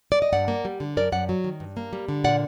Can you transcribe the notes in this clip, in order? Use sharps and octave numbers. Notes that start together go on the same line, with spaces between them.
D5
D#5
G2 D5 F#5
A#3
G3
D3
F#2 A#4 D5
F#2 D5 F#5
F#3
D#3
G2
A#3
G3
D3
A#2 D5 F#5